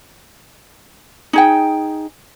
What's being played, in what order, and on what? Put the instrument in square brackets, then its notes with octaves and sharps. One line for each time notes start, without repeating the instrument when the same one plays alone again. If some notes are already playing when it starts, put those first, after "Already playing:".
[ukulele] D#4 G#4 G5